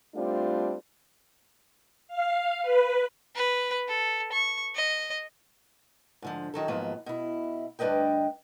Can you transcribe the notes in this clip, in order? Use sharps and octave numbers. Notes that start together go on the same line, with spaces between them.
G3 A3 C4 D4 F4
F5
B4
B4
A4
C#6
D#5
G#2 D3 F3
D#3 F#3 A4
D#2 G#2 F3 F#3 B3
B2 E4
D2 G2 D4 B4 D#5 G5